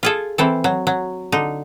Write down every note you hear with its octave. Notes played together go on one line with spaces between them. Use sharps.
F4 G#4 A4
E3 C4 A4
F#3
F#3
D3 D#4